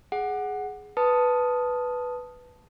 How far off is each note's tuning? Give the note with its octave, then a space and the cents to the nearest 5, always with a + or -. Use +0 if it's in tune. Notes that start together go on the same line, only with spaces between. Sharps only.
G#4 +0 F#5 +0
B4 +0 A5 +0 D#6 +0